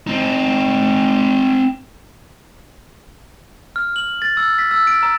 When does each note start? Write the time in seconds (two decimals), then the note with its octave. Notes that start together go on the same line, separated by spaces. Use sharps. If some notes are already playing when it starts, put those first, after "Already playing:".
0.07 C4 D#4
3.76 F6
3.96 F#7
4.22 A6
4.37 E6
4.59 B6
4.71 E6
4.87 D7
5.03 A#5